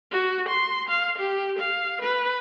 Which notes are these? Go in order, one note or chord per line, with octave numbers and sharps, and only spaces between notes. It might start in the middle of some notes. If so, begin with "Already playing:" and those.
F#4
C6
F5
G4
F5
B4